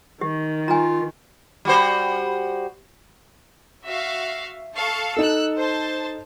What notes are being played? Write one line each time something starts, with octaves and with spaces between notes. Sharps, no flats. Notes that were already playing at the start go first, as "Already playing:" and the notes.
D#3 G4
F4 G#5 A#5
G3 F#4 C5
F#4 E5 F5
A4 F5 C#6
D#4 A4 E6 F#6
C5 A5